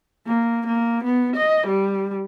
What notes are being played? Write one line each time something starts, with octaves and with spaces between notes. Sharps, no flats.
A#3
A#3
B3
D#5
G3